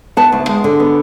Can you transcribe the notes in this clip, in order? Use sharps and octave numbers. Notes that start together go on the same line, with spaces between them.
B3 F#5 A5
D2
G#3
D3
B3